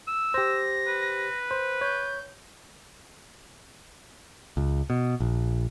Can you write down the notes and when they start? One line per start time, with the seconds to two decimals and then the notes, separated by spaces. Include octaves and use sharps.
0.08 E6
0.34 G4 C5 A#6
0.88 B4
1.51 C5
1.81 C#5 G6
4.57 C#2
4.90 B2
5.20 A#1